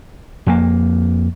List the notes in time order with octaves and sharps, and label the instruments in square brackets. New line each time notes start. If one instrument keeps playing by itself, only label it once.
[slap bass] F2 A#3